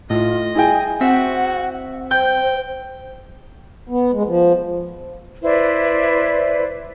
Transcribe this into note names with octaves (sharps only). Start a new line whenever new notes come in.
A2 F4 D#5
E4 G#4 G5 G#5
C4 F#4 E5 F#5
C5 G5 G6
B3
G#3
F3
E4 B4 C5 D5